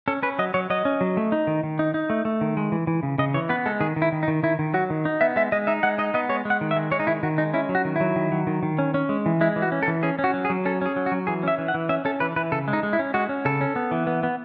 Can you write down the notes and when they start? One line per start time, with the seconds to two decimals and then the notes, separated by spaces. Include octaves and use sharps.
0.08 C#4 A4
0.23 C#4 B4
0.39 F#3 D#5
0.54 F#3 C#5
0.70 F#3 D#5
0.85 C#4
1.01 F#3
1.17 A3
1.32 D#4
1.47 D#3
1.63 D#3
1.79 D#4
1.94 D#4
2.10 A3
2.25 A3
2.41 D#3
2.57 G#3
2.72 E3
2.87 E3
3.03 C#3
3.18 C#3 D#5
3.34 E3 C#5
3.49 B3 B4
3.66 G#3 A4
3.81 D#3 G#4
3.96 D#3
4.02 E4
4.12 D#3
4.23 D#4
4.28 D#3
4.43 D#3 E4
4.59 D#3
4.74 F#3 F#4
4.90 D#3
5.05 D#4
5.21 B3 E5
5.36 G#3 E5
5.52 G#3 D#5
5.67 D#4 E5
5.83 G#3 F#5
5.98 D#4 D#5
6.14 B3 D#5
6.29 G#3 C#5
6.45 G#3 F#5
6.61 D#3
6.71 E5
6.76 G#3
6.91 G#3 C#5
7.00 D#4
7.07 D#3 E4
7.23 D#3 F#4
7.38 G#3 D#4
7.54 C#4 E4
7.69 F#3
7.75 F#4
7.85 D#3
7.96 F#3 E4
8.16 D#3
8.32 F#3
8.47 D#3
8.63 D#3
8.79 C#4
8.94 C#4
9.09 G#3
9.26 E3
9.41 G#3 E4
9.56 E3
9.62 F#4
9.72 C#4
9.83 A4
9.88 E3
10.03 C#4 G#4
10.19 C#4
10.24 F#4
10.34 F#3
10.45 G#4
10.50 F#3
10.65 C#4 A4
10.81 C#4 G#4
10.96 F#3
11.06 F#4
11.12 F#3
11.27 E3 G#4
11.43 C#4 E5
11.58 E3
11.68 F#5
11.74 E3
11.89 C#4 E5
12.05 C#4 A4
12.20 E3 B4
12.36 E3 B4
12.52 C#3 A4
12.68 G#3
12.73 D#4
12.83 G#3
12.93 E4
12.99 C#4
13.14 G#3 F#4
13.29 C#4
13.45 C#3 A4
13.61 C#4
13.76 B3
13.91 E3
14.07 B3
14.23 B3